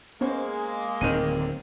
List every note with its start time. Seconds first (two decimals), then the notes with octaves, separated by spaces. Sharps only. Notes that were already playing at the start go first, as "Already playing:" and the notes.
0.21 G#3 A#3 B3 C#4 C5
1.01 D1 D#3 C4 D#7